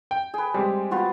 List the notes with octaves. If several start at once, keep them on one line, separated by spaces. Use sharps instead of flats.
G5
G#4 B4
G3 G#3 C4 G4
B3 F4 F#4